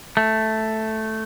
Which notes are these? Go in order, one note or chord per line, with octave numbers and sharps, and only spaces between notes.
A3